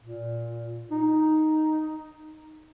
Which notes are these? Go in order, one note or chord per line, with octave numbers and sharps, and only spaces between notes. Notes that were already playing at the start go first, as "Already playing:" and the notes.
A#2
D#4